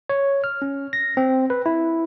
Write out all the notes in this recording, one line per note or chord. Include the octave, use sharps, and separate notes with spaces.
C#5
F6
C#4
A#6
C4
B4
E4